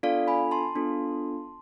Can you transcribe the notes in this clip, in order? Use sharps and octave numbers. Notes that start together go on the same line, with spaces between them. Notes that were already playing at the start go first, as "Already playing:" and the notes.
B3 D4 F4 A4 D5 F5
G#5 B5
A5 C6
B3 D4 F4 A4